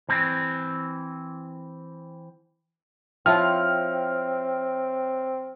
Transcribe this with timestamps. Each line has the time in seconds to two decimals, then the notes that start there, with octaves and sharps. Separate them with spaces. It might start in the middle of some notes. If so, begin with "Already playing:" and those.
0.09 E3 C4
3.26 F3 C4 E4 F4 C#5 E5 G5 F6